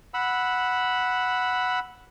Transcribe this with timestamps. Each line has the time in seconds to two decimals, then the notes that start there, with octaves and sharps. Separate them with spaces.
0.14 F#5 B5 E6